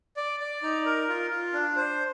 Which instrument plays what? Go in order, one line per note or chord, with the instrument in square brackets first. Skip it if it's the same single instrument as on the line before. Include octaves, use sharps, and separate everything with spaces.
[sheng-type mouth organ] D5
D5
D#4
A#4
F4
F4
D4
C5